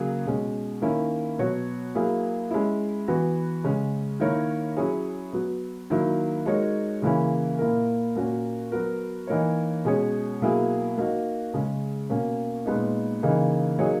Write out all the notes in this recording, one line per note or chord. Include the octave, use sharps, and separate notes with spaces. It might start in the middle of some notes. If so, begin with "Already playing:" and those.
Already playing: C#3 F#3 A#3 G#4
B2 G#3 C#4
D#3 A#3 C#4 E4
B2 F#3 B3 F#4 C#5
F#3 A#3 E4 G#4
G#3 C#4 E4
E3 B3 F#4 B4
C#3 G#3 C#4
D#3 A#3 E4 A#4 C#5
F#3 C#4 E4 G#4 C#5
F#3 B3 F#4
D#3 F#3 A#3 E4
G#3 D#4 F#4 A#4 C#5
C#3 E3 A#3 C#4 E4
A#2 A#3 E4 A#4
A#2 A#3 C#4 F#4 A#4
F#3 B3 F#4 A#4
E3 A#3 D#4 A#4 C#5
B2 G#3 C#4 G#4 C#5
B2 F#3 A#3 E4 G#4
A#3 D#4 F#4
C#3 G#3 C#4
B2 A#3 C#4
A#2 G#3 B3 D#4
C#3 E3 A#3 D#4
F#3 A#3 D#4 G#4 C#5